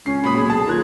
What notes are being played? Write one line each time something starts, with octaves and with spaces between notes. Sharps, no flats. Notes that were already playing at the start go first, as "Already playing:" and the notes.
C#2 C#4 C7
A#2 F#3 B5 D#6
B1 G#4
A5
D#2 F4 A#4 F#6 G#6